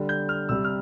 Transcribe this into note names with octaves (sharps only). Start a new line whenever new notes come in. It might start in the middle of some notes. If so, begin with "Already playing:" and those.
Already playing: D3 G3
G6
F6
C3 G3 E6
F6